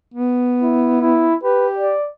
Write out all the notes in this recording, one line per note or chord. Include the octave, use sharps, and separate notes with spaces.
B3
E4
E4
G4 B4
D5